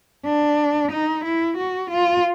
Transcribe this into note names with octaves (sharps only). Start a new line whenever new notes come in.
D4
D#4
E4
F#4
F4